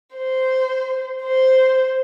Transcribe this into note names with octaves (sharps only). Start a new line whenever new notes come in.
C5
C5